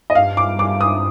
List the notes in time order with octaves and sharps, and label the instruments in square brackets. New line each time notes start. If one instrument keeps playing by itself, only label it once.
[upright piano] D#5
[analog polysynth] G2 [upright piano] F5
[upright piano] D6
[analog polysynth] G2 [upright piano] D6
[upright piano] D#6